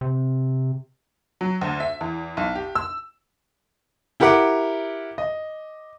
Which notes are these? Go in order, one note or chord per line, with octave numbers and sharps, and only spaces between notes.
C3
F#3
D2
E5
E2
B1
G4
E6
E4 G4 A#4 F#5 D6
D#5